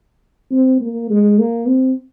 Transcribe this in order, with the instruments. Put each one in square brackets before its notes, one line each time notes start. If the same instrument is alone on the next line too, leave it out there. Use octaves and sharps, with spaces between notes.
[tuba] C4
A#3
G#3
A#3
C4